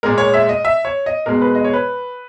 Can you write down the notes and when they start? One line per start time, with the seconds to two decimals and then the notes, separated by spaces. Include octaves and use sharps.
0.03 A#2 G#3 A#4
0.18 C#5
0.34 E5
0.49 D#5
0.65 E5
0.85 C#5
1.06 D#5
1.26 B2 G#3 A#4
1.42 B4
1.55 D#5
1.64 C#5
1.73 B4